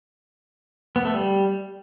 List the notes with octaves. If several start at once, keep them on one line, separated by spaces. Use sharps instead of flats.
B3
A3
G3